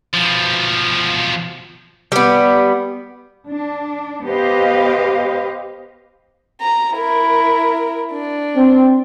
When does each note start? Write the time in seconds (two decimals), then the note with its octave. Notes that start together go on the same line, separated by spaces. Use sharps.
0.13 B2 F3
2.12 G3 B3
3.48 D4
4.25 B3 G4 B4 C5 D#5 F5
6.62 A#5
6.94 E4 A#4
8.12 D4
8.55 C4